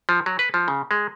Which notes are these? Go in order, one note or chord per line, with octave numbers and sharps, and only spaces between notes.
F3
F#3
B4
F3
C#3
G#3